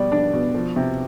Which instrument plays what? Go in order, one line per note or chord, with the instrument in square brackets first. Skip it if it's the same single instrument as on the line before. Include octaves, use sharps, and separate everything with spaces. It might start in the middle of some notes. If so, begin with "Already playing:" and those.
Already playing: [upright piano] B2 G3 [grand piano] D5
[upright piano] D4
B2
F3
C3